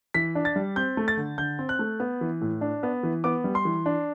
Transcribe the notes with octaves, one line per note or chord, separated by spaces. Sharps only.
E3 B6
D4
A6
G3
C4 G6
A3
A6
D3
D3 G6
C4
F#6
A3
B3
E3
A2
D4
B3
E3
B3 D6
G3
C6
E3
D4